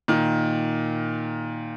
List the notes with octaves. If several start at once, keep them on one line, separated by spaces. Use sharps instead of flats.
A#2 D#3